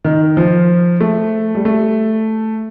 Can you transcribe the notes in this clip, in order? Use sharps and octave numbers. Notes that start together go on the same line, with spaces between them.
D#3
F3
A3
G3
A3